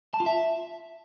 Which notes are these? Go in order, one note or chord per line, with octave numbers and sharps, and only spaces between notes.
A5
F4
E5